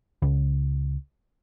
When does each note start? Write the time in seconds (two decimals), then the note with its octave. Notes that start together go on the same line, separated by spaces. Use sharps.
0.22 C#2